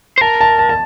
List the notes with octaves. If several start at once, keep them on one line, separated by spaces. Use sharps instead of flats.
C5
A#4 A5
A5
A5
A5